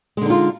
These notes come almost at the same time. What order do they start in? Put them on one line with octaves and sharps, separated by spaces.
G#3 D3 D#4 F4